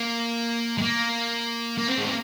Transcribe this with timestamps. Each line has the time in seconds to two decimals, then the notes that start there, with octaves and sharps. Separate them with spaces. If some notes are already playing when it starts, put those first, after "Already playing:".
Already playing: A#3
0.78 G#3
0.82 A#3
1.78 A#3
1.88 C4
1.98 G#3
2.07 A#3